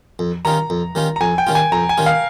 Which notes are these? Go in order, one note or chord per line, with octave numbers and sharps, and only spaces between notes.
F2
D#3 G3 C#4 F4 A#5
F2
D#3 G3 C#4 F4
A#5
F2 G#5
G5
D#3 G3 C#4 F4
G#5
F2 A#5
G#5
D#3 G3 C#4 F4
F5